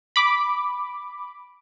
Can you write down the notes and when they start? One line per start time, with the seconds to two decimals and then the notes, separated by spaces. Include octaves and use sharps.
0.16 B5 D6